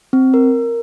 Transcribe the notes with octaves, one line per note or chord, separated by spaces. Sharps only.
C4
A#4